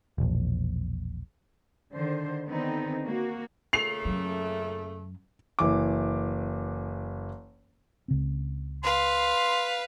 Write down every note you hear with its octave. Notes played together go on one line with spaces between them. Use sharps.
E1 A#1
D3 D#3 C5
D3 D#3 B3 C4 D#4
A#3 F#4
A#2 C#3 A3 C7 F7
F#2 F#3
F#1 E3 D6
C#2 C#3 C4
B4 F5 C6